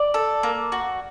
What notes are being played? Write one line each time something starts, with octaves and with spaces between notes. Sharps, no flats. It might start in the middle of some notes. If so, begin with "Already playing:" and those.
Already playing: D5
A4
A#3
F#4